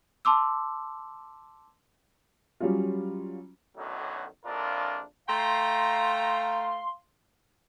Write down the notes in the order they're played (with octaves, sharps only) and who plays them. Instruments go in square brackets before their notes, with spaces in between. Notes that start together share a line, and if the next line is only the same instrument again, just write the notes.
[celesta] A5 C6 D6 E6
[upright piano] F#3 G3 C#4 F4
[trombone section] B1 F#2 A2 D3 D#3 F#3
A#1 F2 D4 E4 F4 A#4
[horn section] A3 G5 A#5 [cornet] F5 [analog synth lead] C6